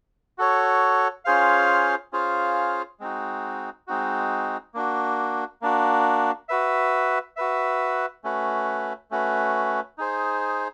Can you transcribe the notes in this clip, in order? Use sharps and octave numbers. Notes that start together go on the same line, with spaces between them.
F#4 A4 C#5
C#4 F4 G#4 C5 F5
C#4 F4 G#4 C5 F5
G#3 C4 D#4 F#4
G#3 C4 D#4 F#4
A#3 D4 F#4
A#3 D4 F#4
F#4 B4 E5
F#4 B4 E5
A3 C#4 F#4 B4
A3 C#4 F#4 B4
D#4 G#4 C5